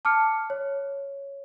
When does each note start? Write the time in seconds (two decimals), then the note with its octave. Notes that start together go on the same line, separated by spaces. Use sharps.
0.05 A5 D6 F6 C#7
0.50 C#5